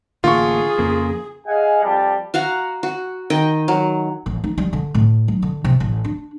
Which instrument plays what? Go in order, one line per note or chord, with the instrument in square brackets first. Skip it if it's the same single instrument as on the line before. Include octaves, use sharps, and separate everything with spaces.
[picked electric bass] A1 D3 A#3 [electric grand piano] F4 C#6 [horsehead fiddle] G#4
[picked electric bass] F2 C#3 A#3
[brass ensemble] G#4 D#5 F5 F#5 G#5
F2 G3 G4 A5
[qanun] F#4 F5 F#5 A#5
F#4
D#3 D#5 G5
F#3
[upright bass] A1
D#4
G3
D3
A2
F#3
D3
C3
A1
D4